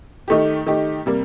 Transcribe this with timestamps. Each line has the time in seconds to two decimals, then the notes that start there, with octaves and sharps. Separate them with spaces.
0.28 D#3 A3 D#4 G4
0.66 D#3 A3 D#4 G4
1.06 C3 G3 A#3